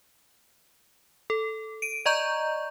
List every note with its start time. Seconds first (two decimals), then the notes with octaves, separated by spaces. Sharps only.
1.30 A4
1.82 D7 D#7
2.06 D5 D#5 A#5 C#6 G6